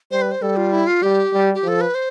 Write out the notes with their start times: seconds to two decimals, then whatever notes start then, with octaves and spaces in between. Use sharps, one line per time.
0.11 G3 C5
0.22 B4
0.31 C5
0.42 G3 A4
0.57 F4
0.72 E4
0.87 F4
1.02 G3 G4
1.33 G3
1.54 G4
1.64 F3 A4
1.81 B4
1.95 C5